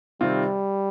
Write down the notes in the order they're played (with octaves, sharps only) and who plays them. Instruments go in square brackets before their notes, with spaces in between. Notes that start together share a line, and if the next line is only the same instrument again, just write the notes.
[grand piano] C3 D#3 C4 F4 [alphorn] G3